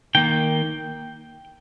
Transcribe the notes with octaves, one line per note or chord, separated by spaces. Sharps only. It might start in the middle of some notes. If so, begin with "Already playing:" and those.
D#3 A#3 G5